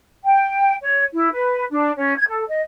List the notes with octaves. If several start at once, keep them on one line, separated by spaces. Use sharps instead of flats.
G5
C#5
E4
B4
D4
C#4
G#6
A4
D#5